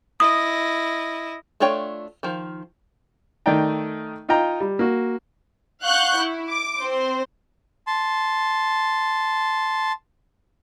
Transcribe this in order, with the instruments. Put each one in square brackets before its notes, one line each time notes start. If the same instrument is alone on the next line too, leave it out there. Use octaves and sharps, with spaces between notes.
[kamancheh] E4 D#5 [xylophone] D#6
[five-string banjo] A3 D4 F4 C#5 G5
D#3 F3
[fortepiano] D#3 A3 D5 D#5 G5 A#5
D#4 F4 D#5 G5 A#5
G3
A#3 F#4
[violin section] F5 F#5 C#6 F#6 G6
E4
D6
C4 C5
[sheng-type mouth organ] A5 C6